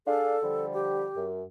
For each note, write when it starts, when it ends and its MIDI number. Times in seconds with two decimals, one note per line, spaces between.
0.07 0.36 62
0.07 0.36 68
0.07 0.66 69
0.07 0.36 77
0.43 1.07 50
0.43 1.07 53
0.43 1.07 55
0.74 1.27 67
1.16 1.42 42